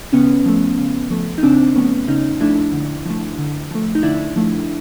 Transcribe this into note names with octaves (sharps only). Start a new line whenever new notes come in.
C#3 B3 C#4
F3 A3
C#3
F3 A3
D#4
C#3 C4 D4
F3 A3 B3 C#4
C#3 C#4 D#4
F3 A3 D4 E4
D3
F3 A3
D3
F3 A3
D#4
D3 D4 E4
F3 A3